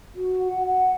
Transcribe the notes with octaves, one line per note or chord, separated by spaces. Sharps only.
F#4
F#5
F#5